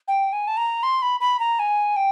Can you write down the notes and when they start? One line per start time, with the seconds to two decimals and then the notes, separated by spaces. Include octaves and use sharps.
0.08 G5
0.33 G#5
0.47 A5
0.57 A#5
0.83 C6
1.02 B5
1.20 B5
1.39 A#5
1.59 G#5
1.96 G5